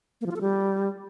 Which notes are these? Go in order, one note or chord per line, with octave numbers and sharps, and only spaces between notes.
A#3
F3
F4
A4
G3